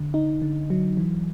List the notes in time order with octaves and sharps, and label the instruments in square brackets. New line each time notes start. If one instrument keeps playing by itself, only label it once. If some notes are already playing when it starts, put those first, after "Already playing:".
Already playing: [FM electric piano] D3
D#4
D3
F#3
E3